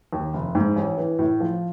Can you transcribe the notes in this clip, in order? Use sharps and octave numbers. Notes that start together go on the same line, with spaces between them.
D#2
F1
G#2
A1
E3
A2
F3